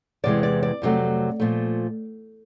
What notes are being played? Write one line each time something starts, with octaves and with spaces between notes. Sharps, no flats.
E2 C3 E3 G#3 D5
D5
D5
F2 C3 D#3 F#3 A3
A#2 F3 A3